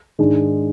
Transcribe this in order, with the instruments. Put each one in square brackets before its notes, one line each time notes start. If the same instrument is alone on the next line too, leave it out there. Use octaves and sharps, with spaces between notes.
[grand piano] G#2 D#3 G#3 D4 G#4